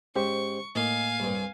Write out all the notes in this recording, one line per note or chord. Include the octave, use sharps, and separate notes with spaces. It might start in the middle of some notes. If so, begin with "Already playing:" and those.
G#2 C#4 G4 C5 C#6
A2 A#3 D#4 F5 G#5
C2 G2